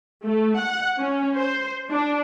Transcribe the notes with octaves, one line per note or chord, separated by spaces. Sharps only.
A3
F#5
C#4
C5
D4